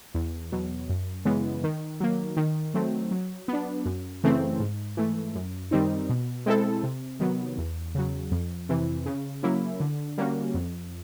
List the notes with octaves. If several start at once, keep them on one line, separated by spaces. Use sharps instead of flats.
E2
B2 F#3
F#2
C#3 E3 G#3 B3
D#3
F#3 A#3
D#3
F#3 A3 C4
F#3
B3 D4
F#2
C#3 E3 A3 C4
G#2
E3 A3
F#2
D#3 G3 C4 D#4
B2
G#3 C4 E4 A4
C3
D#3 F#3 B3
E2
C#3 F#3
F2
C3 E3
C#3
F#3 A#3 C#4 E4
D3
G3 A#3 C#4 F#4
F2